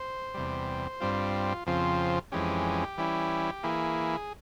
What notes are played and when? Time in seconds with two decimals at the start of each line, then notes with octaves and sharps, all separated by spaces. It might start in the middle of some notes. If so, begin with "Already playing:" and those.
Already playing: C5
0.34 E2 C3 G3
1.00 G2 G3 C4 F4
1.66 F2 C#3 F3 C4 F4
2.32 F2 E3 G#3 C#4 G4
2.98 E3 G3 C#4 E4
3.63 E3 A#3 E4 G#4